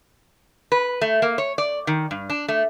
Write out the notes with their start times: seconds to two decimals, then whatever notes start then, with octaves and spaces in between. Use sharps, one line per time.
0.72 B4
1.01 A3
1.22 A#3
1.38 C#5
1.58 D5
1.87 D#3
2.11 G2
2.30 D4
2.48 A3